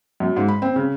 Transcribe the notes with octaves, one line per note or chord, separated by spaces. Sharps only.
F#2
G#2
B5
C4
C#3